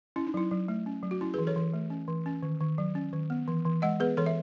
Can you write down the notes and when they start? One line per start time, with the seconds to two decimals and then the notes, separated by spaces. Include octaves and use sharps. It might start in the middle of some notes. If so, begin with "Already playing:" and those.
0.16 C#4 E4
0.27 D#4
0.34 F#3 E4
0.51 F#3
0.68 A3
0.86 C#4
1.03 F#3
1.11 F#4
1.21 C#4 E4
1.34 G#4 B4
1.39 E3
1.47 A4 C#5
1.56 E3
1.73 A3
1.90 C#4
2.08 E3
2.26 C#4
2.43 D#3
2.60 D#3
2.78 F#3
2.95 C#4
3.13 D#3
3.30 B3
3.48 E3
3.66 E3
3.82 G#3 D#5 F#5
4.00 B3 G#4 B4
4.17 E3 A4 C#5
4.26 E5